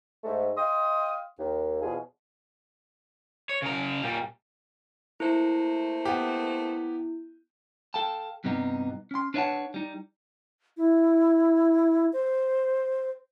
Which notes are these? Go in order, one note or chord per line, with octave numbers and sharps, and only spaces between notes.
G#2 A3
D#5 F5 G5 C6 D#6
D#2
E2 B2 F3 F4 G#4
C#5
C#3 A#4
A#2 G3
A3 A#3 E4 C5
B3 G4
A4 F5 G5 A5
G2 C3 G3 B3 D#4
C#4 C6
D4 B4 C#5 D#5 F#5 A5
G3 D#4
E4
C5